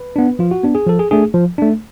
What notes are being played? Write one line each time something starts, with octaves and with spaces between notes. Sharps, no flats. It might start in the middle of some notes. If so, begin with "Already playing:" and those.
Already playing: B4
B3 D4
F3 F4
F#4
B3 D4
G#4
F3 A4
G#4
A3 D4 G#4
F3
A3 D4